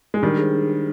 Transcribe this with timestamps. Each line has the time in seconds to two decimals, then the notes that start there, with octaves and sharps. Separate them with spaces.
0.14 G#3
0.22 D#3 G3 D4
0.38 G#4 C5
0.54 D4
0.69 G#4 C5